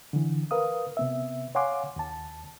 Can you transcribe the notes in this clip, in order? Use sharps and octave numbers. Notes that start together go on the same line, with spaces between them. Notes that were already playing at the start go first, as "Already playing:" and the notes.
D3 E3
A#4 B4 F5 D#6
C3 B3 E5
C#5 F5 F#5 G#5 C6 D6
D#2 A5